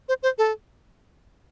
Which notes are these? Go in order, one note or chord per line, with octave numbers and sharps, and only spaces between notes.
C5
C5
A4